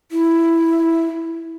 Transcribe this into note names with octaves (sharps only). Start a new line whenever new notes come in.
E4